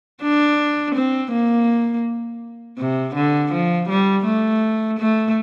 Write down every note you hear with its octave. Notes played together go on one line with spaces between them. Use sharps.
D4
C4
A#3
C3
D3
F3
G3
A3
A3